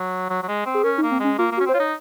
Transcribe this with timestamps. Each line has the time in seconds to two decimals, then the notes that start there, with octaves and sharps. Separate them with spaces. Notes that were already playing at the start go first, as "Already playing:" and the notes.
Already playing: F#3
0.30 F#3
0.43 F#3
0.48 G#3
0.66 C4
0.74 G#4
0.84 C#4 A#4
0.98 D#4
1.02 A#3
1.11 C4
1.20 G#3 C#4
1.39 A#3 F4
1.52 A#3
1.57 F#4
1.60 C#4
1.66 C4 C5
1.74 F4 C#5
1.79 D#4